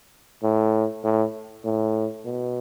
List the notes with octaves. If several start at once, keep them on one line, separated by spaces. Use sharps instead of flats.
A2
A2
A2
B2